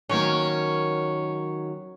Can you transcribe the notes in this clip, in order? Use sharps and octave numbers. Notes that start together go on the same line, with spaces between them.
D#3 F#3 A#3 C#4